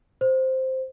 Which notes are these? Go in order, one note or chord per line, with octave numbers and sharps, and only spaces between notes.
C5